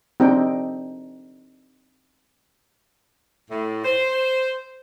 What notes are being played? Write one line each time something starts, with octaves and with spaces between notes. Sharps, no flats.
C4 D4 D#4 G4 G5
A2
C5